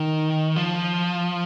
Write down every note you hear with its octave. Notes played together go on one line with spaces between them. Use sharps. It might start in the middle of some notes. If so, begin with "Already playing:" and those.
Already playing: D#3
F3